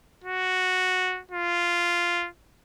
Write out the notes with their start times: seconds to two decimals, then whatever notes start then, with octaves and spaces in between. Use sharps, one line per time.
0.24 F#4
1.31 F4